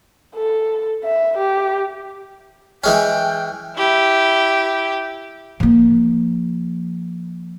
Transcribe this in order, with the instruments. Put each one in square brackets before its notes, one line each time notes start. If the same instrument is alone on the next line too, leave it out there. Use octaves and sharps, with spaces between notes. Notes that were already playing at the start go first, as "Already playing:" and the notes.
[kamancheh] A4
E5
G4
[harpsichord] E3 G#3 C#4 [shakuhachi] G5
[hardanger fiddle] E4 G4
[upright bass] F3 A#3